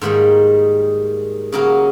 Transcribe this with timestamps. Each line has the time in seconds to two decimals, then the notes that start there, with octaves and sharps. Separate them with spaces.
0.01 G#2 D#3 G3 A#3
1.52 C#3 F#3 A#3 C#4